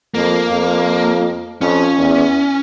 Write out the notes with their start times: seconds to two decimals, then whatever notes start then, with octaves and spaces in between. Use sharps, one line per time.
0.14 F2 A#3
0.51 F2
1.61 F2 C#4
1.98 E2